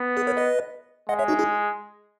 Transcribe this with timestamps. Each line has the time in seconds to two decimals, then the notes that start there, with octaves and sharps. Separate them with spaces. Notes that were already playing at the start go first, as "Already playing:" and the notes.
Already playing: B3
0.17 G#4 B4
0.27 A#4 C#5
0.37 B4 D#5
1.09 G#3 D#5 F#5
1.19 C#5 E5
1.28 D#4 F#4
1.39 E4 G#4